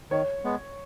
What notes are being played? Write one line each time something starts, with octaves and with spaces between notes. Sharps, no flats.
D#3 C#5
G#3 B3